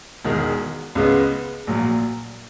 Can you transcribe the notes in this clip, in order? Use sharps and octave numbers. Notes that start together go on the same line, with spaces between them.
E1 E2 D#3 G#3
C#2 C#3 G#3 B3
A#1 A#2 F#3